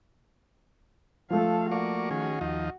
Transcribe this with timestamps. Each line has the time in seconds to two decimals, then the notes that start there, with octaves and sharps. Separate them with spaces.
1.30 F3 A3 A4 F5
1.71 A#3 F#4 D5 C#6
2.11 D#3 C#4 G#4
2.41 D#2 F3 D#4